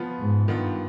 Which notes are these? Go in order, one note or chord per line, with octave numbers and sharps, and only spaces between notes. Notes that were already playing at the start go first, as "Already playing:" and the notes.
Already playing: F3 B3 F4
G#2
G2 D#3 B3 D4 F4